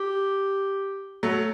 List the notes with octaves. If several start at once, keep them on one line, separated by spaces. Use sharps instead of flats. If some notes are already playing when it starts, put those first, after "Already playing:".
Already playing: G4
F#3 A3 A4